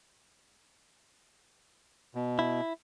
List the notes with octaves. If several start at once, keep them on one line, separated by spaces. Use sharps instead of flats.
B2
E4